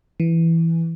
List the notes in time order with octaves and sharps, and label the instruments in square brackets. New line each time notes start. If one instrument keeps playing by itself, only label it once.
[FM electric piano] E3